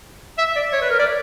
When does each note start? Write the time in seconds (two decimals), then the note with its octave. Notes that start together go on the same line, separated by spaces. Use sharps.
0.38 E5
0.56 D5
0.73 C#5
0.82 B4
0.90 A#4
0.99 D5